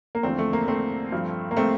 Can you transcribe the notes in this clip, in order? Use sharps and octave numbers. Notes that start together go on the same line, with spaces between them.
A#3
E2 D3 F3 A3 C4
A3
A#3
A3 C4
G2 F3
A#3
A3 C4